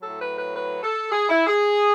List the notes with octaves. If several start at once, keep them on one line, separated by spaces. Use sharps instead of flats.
A2 F#3 A4
B4
B4
B4
A4
G#4
E4
G#4